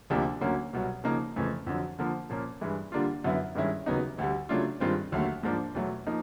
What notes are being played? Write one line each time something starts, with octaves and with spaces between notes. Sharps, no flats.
D2 C3 F3 A#3 D4
D2 D3 F#3 A#3 C#4
C2 B2 F#3
C#3 F3 A#3 D#4
F2 C#3 E3 A3
F2 D3 F#3
D3 F3 A#3
A#2 F3 A#3 C#4
G2 E3 G#3
D3 G3 A#3 D4 F4
F#2 D3 F#3 B3 E4
G2 D#3 G#3 C#4 E4
D#2 C#3 F#3 B3 D#4
D2 D3 G3
C#3 F#3 A3 D4 F4
G2 D#3 G#3 C4 F4
D#2 D3 F#3 A3
G#2 F3 A#3 D4
E2 B2 F#3 A3
F3 A#3 D#4